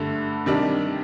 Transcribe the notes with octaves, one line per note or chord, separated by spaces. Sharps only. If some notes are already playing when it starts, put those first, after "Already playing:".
Already playing: G2 D3 A3
C3 D#3 G3 D4